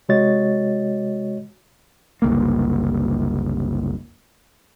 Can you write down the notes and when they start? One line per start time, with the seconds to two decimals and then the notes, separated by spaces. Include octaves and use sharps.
0.09 C3 G#3 F#4 C#5 D#5 A6
2.22 F#1 C2 A#3